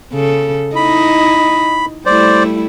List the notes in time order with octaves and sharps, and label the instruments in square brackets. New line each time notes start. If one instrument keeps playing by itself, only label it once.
[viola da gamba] C#3 A4
[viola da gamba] D#4 E4 D#5 [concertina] B5
[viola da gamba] G3 A3 E4 [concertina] C5 D5